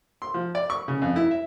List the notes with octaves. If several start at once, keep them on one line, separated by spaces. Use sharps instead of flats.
C6
F3
D5
C#6
C#3
F2
E4
E5